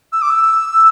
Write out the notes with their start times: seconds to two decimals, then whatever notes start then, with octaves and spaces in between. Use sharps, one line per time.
0.12 E6
0.22 D6
0.30 E6